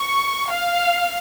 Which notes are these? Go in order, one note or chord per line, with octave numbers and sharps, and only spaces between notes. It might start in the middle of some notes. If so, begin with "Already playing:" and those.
Already playing: C#6
F5